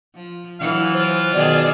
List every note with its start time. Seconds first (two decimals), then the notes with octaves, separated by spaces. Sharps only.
0.15 F3
0.60 E3 F#3 E4 F5
0.94 F4 C5
1.34 B2 D#3 G#4 D5